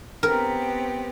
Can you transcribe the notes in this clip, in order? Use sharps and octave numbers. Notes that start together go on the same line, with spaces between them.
B3 C4 G4 A#4